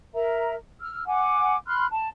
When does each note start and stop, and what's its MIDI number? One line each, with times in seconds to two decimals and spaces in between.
0.14 0.55 70
0.14 0.55 76
0.14 0.55 82
0.81 1.05 88
0.81 1.05 89
1.07 1.56 78
1.07 1.56 80
1.07 1.56 86
1.67 1.86 83
1.67 1.86 84
1.67 1.86 89
1.67 1.86 90
1.91 2.08 81